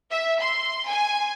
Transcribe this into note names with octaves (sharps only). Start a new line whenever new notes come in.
E5
C6
G#5